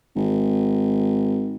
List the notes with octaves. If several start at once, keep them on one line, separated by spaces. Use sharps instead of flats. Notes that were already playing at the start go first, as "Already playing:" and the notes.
G#1